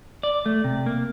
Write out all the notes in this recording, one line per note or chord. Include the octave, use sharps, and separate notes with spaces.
D5
A3
C3
A#3